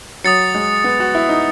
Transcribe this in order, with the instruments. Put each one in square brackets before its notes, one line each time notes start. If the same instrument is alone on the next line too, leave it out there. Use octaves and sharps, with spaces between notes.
[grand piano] F#3 [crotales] D#6 A6 C#7
[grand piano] G#3
B3
F#4
E4
D#4